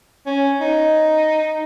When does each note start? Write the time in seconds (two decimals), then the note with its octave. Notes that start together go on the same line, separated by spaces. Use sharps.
0.27 C#4
0.61 D#4